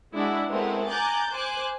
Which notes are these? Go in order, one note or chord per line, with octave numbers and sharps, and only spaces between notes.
G#3 D4 E4 F#4
G#3 A3 B3 C4 E4 A#4
G#5 A#5 D6 F#6 G6 A6
C5 G#5 D6 F#6